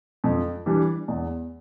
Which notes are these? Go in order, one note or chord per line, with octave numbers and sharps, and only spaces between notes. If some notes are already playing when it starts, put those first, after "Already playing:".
F2
E3 G3 D4
E2